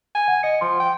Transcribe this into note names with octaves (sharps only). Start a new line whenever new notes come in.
G#5
F#5
D#5 C#7
F3 C6
G5